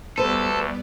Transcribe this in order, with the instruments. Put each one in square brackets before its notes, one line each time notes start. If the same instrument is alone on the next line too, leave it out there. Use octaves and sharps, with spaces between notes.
[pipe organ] D2 [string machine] G3 B3 D5 [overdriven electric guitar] A4 [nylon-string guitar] B4 C5